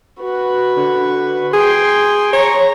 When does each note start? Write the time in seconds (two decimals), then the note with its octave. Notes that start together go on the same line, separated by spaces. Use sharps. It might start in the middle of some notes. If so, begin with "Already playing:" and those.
0.20 F#4 B4
0.77 D3
1.54 G#4 G5 C6
2.33 C#5 A#5